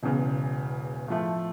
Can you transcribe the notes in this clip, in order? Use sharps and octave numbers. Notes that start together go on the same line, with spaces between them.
E1 E2 C#3
A2 F3 A3